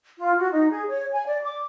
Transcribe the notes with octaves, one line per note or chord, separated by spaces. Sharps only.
F4
F#4
D#4
G#4
C#5
G#5
D5
D6